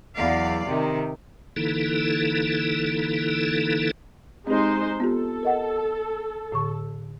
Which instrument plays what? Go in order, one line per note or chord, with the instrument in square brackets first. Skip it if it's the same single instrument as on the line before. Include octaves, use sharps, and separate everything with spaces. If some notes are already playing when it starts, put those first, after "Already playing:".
[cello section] E2 F#3 D5 F5
C3 D#3
[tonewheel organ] D3 E3 A#3 D#4 E4 A4
[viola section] G#3 D#4 C5 [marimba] C4 G4
[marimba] B3 F4 G4 [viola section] A4
[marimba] A#4 D#5 F#5
A2 D3 C#6